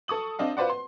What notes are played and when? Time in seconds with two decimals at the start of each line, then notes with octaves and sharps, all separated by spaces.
0.08 A4 C#6 D#6 F#7
0.39 C4 D4 D#5 F5
0.57 F4 B4 C5 D5 F#5
0.70 C6